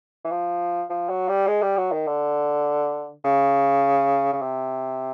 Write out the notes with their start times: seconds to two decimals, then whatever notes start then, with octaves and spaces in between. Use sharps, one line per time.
0.25 E3
0.31 F3
0.90 F3
1.10 F#3
1.29 G3
1.48 G#3
1.62 G3
1.77 F#3
1.92 D#3
2.07 D3
3.25 C#3
4.33 C#3
4.42 C3